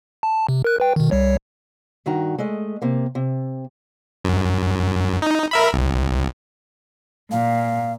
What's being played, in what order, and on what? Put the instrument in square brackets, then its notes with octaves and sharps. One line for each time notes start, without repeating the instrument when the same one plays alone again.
[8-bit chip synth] A5
C3
A#4 F#6
B4 G5
B2 D#3
C2 G3 C#5
[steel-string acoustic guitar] G2 D#3 F#4 A#5
G#3 A3 D#5
C3 A#3
C3
[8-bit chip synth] F#2
D#4
A#4 E5 B5
C2
[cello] A#2 [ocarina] F5